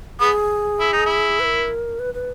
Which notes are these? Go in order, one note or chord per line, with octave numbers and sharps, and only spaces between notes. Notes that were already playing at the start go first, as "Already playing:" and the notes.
B3 G#4
E4
D#4
E4
B4
A#4
B4
B4